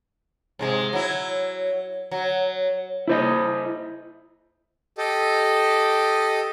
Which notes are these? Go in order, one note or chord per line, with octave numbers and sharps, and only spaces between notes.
G#2 C3 G#3
F#3 E4
F#3
E4 C5 D#5
G4 A4 D#5